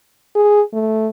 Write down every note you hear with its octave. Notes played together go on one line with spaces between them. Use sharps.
G#4
A3